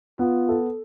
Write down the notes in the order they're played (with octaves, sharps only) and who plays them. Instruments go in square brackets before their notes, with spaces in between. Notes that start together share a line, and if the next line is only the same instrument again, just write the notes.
[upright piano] B3 [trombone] F4
[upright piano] A4